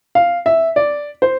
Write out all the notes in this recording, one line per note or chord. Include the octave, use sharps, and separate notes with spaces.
F5
E5
D5
C5